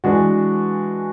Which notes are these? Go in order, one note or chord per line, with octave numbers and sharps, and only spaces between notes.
E3 G#3 D4 F#4